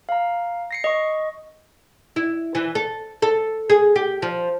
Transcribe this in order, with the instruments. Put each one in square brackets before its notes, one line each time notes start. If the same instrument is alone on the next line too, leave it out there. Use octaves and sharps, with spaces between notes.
[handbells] F5 A#5
A#6 C7 C#7
D#5 C#6
[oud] E4
E3
A4
A4
G#4
G4
F3